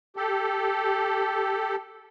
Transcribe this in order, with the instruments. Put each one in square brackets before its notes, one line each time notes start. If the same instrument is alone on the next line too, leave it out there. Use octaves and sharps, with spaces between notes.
[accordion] G4 A4